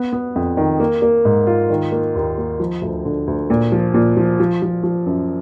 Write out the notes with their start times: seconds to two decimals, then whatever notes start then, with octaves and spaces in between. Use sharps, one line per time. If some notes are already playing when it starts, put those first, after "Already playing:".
Already playing: B3
0.13 B3
0.35 F2
0.57 D#3
0.80 A#3
1.02 A#3
1.25 G#2
1.47 F4
1.70 D#3
1.92 A#3
2.15 D#2
2.38 A#3
2.60 F3
2.81 D2
3.05 D3
3.27 D2
3.50 A#2
3.72 F3
3.94 A#2
4.17 F3
4.40 F3
4.62 F3
4.84 F3
5.06 F#2